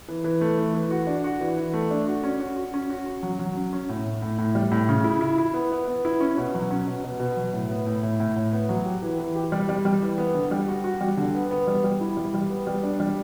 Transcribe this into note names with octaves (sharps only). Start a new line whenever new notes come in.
E3
E3
A3
E3
E3
F#4
D4
F#4
E3
E3
A3
D4
F#4
C#4
F#4
F#4
C#4
F#4
C#4
F#3
F#3
C#4
C#4
A2
A2
A2
A2
G3
A2
C#3
E4
E4
E4
B3
B3
B3
E4
C#4
B2
F#3
C#4
B2
B2
B2
F#3
A2
B3
A2
A2
A2
A2
B3
F#3
G4
E3
E3
G4
G3
G3
G3
E3
B3
D3
G3
F#4
F#4
G3
D3
B3
B3
G3
G3
E4
G3
G3
B3
G3
D4
G3